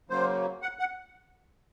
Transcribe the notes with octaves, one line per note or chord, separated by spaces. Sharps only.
C#3 F#3 A#3 C5
F#5
F#5